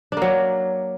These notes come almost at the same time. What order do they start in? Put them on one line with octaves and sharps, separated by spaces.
D4 A#3 F#3